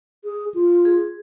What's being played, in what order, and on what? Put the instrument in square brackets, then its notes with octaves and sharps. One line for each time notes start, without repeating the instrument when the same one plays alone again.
[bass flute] G#4
F4
[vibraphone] G#4